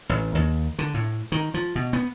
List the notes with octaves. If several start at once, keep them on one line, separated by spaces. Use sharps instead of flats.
A1
D#2
D3
A2
D#3
F3
B2
B3